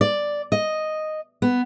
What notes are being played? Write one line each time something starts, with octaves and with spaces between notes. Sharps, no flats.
D5
D#5
B3